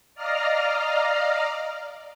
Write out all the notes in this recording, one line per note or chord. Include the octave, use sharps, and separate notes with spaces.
D5 D#5 F5 A#5 F6